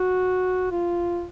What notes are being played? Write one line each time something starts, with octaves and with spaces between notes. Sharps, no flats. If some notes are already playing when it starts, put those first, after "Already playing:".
Already playing: F#4
F4